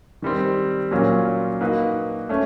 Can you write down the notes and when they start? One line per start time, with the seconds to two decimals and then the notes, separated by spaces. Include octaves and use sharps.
0.22 D#3 G3 C4
0.91 A#2 F#3 A#3 C#4 F4
1.61 A#3 D#4 F#4 B4
2.29 A3 C#4